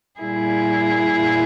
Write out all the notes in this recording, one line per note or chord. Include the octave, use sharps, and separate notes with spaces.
A#2 G3 E4 G#4
A#2